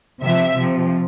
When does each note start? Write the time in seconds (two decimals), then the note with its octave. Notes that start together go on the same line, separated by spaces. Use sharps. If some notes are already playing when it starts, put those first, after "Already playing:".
0.23 C3 F3 E5
0.57 C3 F3